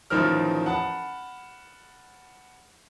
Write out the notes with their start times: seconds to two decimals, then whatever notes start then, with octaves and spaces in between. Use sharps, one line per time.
0.10 A1 D#3 F3 A#4 F6
0.66 F#5 A5 B5